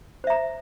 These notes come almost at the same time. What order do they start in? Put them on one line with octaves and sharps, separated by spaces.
C5 E5 A#5